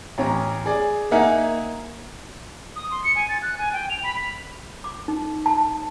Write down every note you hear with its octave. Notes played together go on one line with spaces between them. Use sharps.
A1 C#4 A#5
G#4 D5
A#3 D#4 E5 F#5 G#5 A#5
D#6
C6
C#7
G#5
A6
F#6
G#5
G5
F7
B5
D6
D#4
A5